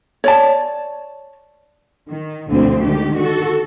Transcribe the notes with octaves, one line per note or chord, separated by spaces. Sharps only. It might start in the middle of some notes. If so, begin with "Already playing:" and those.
C#5 D5 A5
D#3
D2 B2 D3 F3 C4
D3 D#3 G#3 G4
F#4 A4